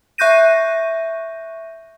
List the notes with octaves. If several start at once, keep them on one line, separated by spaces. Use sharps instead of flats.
E5 C#6 F#6 G6 A#6 D#7